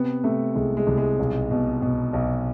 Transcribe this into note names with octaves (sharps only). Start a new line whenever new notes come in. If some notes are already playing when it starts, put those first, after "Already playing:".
Already playing: C3 B3
C3 A3
C2 G#3
G#3
C2
G#3
B1
B2
B2
B1